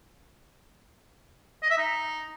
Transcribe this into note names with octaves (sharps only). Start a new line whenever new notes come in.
D#5
E5
D#4